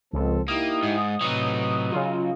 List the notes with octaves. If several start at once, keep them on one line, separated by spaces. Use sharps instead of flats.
C#2 F3 C4 A4
A#3 D#4 E4 G4 D#6
G#2
A2 C3 F#3 D#4 B4
C#3 F4